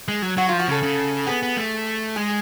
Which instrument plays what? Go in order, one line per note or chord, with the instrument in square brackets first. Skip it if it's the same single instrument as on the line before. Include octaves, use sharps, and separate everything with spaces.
[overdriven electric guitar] G#3
F#3
[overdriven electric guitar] F#3 [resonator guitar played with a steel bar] F#4
[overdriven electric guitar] F3 [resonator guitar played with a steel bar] F4
[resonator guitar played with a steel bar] F#4
[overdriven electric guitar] C#3 [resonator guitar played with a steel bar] A4
[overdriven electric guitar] C#3
[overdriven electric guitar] B3 [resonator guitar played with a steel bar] G#4
[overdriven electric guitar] B3
A3
[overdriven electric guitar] G#3 [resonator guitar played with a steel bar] G#4